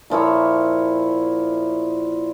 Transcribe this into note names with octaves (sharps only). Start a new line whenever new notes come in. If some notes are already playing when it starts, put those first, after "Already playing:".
A#2 F3 E4 C#5